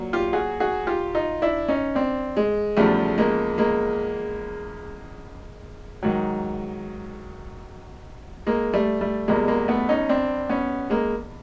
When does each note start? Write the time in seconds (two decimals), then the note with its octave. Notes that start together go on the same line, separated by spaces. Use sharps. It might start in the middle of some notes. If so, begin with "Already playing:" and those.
Already playing: A#2 F#3
0.13 F4 G4
0.33 F#4 G#4
0.60 F#4 G#4
0.87 F4 G4
1.15 D#4 F4
1.42 D4 E4
1.68 C#4 D#4
1.95 C4 D4
2.37 G#3
2.77 E2 C#3 F3 G3 A3
3.18 G#3 A#3
3.58 G#3 A#3
6.03 G#2 D#3 F#3
8.47 G#3 A#3
8.74 G3 A3
9.01 G3 A3
9.28 E2 B2 G3 G#3 A#3
9.48 G#3 A#3
9.68 A3 B3
9.89 C#4 D#4
10.09 C4 D4
10.49 B3 C#4
10.90 G#3 A#3